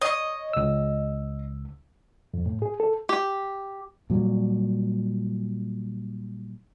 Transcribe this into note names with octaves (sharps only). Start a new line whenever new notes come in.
C#5 D#5
C#2 E6
F2
A2
G#4
A4
G4
A#2 F#3 G3